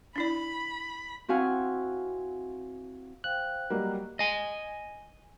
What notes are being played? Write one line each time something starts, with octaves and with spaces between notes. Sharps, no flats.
D4 E4 D5 B5
C4 E4 F#4 F5 F#5 G#5
C5 F5 G5 F#6
F#3 G3 A#3 D#5
D#5 G#5